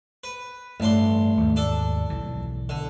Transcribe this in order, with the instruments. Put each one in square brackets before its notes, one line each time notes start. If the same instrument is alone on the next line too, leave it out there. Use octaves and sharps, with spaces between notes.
[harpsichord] B4
[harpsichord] A1 D4 C6 [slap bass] G2
[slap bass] D#2 G#2
[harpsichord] D4 A4
[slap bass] B1 E3
[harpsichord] D3